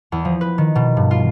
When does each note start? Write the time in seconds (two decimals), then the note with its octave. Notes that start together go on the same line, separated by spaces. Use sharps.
0.12 E2
0.25 F3
0.41 B4
0.58 D#3
0.75 B2
0.97 G2
1.11 F4